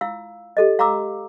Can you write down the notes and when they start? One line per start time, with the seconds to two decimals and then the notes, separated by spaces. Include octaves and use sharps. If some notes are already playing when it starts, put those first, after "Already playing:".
0.01 E4 F4 F5 E6
0.57 G4 A4 D#5
0.79 F5 A#5 C6 D6 E6